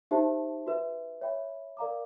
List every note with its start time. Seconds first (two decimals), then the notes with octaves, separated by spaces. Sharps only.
0.11 D#4 G4 C5 E5 A5
0.66 F#4 B4 E5
1.21 C#5 E5 G5 B5
1.77 A#4 D5 F5 A#5 D6